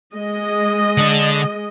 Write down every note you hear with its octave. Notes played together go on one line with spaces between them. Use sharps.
G#3 D#5
D3 D4